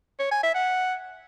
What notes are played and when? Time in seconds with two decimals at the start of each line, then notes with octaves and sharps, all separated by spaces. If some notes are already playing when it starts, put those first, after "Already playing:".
0.20 C#5
0.31 G#5
0.43 E5
0.55 F#5